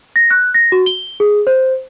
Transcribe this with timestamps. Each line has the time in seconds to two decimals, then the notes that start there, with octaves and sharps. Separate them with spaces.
0.16 A#6
0.30 F#6
0.54 A#6
0.72 F#4
0.86 G7
1.20 G#4
1.47 C5